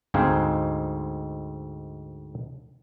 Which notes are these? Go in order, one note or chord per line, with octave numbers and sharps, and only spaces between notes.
D2 G#2 C4 D#4 F5 G#5